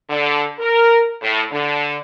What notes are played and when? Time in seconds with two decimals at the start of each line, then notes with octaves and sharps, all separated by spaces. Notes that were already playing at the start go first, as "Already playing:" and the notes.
0.10 D3
0.59 A#4
1.23 A2
1.51 D3